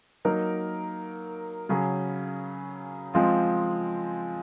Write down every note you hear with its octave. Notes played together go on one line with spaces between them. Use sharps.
F#3 A#3 D#4 A#4
C#3 F#3 C#4 G#4
F3 G#3 C4 F4